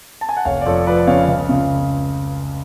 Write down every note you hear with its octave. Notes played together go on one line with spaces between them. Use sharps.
A5
G#5
F#5
F1 C#5 F5
D5
F2 A4 C#5
F3 B4 D5
C#3 C#5 F5
C#2
C#3